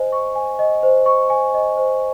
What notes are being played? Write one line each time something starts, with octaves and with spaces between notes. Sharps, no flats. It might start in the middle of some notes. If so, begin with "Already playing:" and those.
Already playing: C5 D#5 G#5
C#6
G#5
D#5
C5
C#6
G#5
D#5
C5